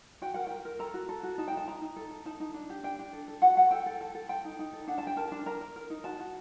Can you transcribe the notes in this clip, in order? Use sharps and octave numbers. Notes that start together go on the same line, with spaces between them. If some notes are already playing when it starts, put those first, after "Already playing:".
F#4 G5
A#4 F#5
A#4 G5
A#4
A4 A#5
F#4
A4
F#4
D#4 A5
G5
D#4
A5
D#4 A#5
D#4
A4
A4
D#4 A5
D#4
D4
G4
D4 G5
D4
A4
A4
F#4 F#5
A4 F#5
A4 G5
A4
A4
A4
A4 G5
D#4
D#4
A4
D4 F#5
A5
G4 G5
A#4 A5
D4 A5
A#4 A#5
A#4
A#4
D#4
F#4 A5
F#4